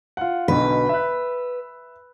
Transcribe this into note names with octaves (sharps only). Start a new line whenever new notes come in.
F4 F#5
B1 B2 D3 B4
E5 F#6